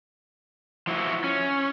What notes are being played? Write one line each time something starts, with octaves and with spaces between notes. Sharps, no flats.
F3 E4 F#4
C#4